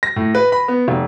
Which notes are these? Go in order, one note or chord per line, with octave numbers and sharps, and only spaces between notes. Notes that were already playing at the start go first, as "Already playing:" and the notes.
A#6
A2
B4
B5
B3
F1